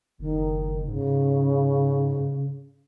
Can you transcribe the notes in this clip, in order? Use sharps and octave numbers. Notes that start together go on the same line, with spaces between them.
F#1 D#3
G#2 C#3